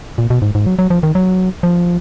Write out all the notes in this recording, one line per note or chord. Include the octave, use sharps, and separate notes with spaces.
A#2
B2
G#2
G#2
F#3
F#3
F3
D#3
F#3
F3